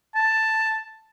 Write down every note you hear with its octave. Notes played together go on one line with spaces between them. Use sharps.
A5